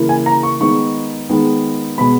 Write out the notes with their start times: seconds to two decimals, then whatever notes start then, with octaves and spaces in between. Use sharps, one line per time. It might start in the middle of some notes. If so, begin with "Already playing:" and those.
Already playing: C#3 E3 A#3 E4
0.09 G#5
0.26 A#5
0.43 C#6
0.60 D#3 G#3 B3 D#4 C#6
1.29 D#3 G#3 B3 D#4
1.98 B2 G#3 B3 B5